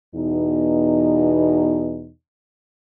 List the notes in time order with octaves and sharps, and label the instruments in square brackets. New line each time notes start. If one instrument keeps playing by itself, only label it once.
[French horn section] E2 B2 D#4